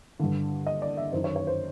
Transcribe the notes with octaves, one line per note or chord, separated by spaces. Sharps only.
G2 D3
D#5
D5
E5
F#2 D#3 C5
C#5
C#5
C5